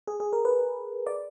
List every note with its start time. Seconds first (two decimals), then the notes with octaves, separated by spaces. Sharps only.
0.07 G#4
0.20 G#4
0.33 A#4
0.45 B4
1.07 D5